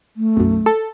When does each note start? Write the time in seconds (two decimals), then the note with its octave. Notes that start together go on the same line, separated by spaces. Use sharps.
0.17 A3
0.37 B1 F#2
0.66 A4